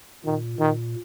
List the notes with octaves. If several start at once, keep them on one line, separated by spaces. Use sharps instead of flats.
A#2 D#3
A#2 D#3